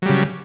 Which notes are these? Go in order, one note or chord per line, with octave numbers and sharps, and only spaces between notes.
C#3 F#3 G3